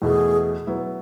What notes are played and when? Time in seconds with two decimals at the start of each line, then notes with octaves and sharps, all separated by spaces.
0.02 E2 B2 A3 G#4
0.67 F#3 B3 E4